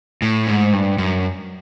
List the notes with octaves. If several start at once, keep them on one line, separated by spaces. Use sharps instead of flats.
A2
G#2
G2
F#2